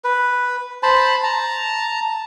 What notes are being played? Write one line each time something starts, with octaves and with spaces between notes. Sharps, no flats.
B4
C5 A5 B5
A5 A#5